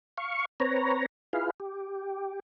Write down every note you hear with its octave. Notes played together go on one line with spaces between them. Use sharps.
F5 C#6
C4 B4 C#5 A#5
E4 F4 G#4 B4 F5
G4